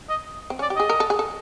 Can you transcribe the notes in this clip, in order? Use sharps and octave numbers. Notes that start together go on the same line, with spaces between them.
D#5
C4
C#4 D5
G4
G#4 D#5
A#4
A4
G#4
A4